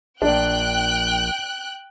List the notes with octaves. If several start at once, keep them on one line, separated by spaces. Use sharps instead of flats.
A#1 D4 G5 F#6